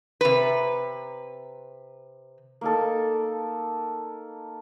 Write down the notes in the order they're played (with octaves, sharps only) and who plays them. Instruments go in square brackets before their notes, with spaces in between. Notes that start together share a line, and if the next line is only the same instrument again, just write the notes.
[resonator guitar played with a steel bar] C3 B4
[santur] A#3 D#4 A4